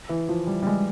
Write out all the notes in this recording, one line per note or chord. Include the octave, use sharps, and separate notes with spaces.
E3
F3
G3
G3
G#3